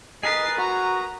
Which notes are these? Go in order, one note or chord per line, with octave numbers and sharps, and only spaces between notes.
G#4 A#4 B4 D#5 A6 C7
F#4 A#5